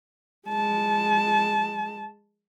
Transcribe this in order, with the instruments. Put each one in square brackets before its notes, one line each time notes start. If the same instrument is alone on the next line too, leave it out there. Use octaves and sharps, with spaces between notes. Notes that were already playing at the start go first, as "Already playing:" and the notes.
[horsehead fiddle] G#3 A5